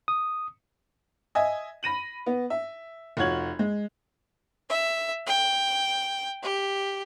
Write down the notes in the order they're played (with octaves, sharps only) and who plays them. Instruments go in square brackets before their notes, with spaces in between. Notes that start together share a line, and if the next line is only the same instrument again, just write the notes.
[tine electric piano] D#6
[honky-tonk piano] D#5 E5 G#5
B5 A#6 D#7 F#7
B3
E5
F1 F4 F#4 C#5 G#6 F#7
G#3
[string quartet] E5
G5
G4